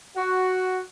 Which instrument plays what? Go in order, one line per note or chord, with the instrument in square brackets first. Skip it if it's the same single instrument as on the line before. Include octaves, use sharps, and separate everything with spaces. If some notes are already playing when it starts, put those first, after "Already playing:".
[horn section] F#4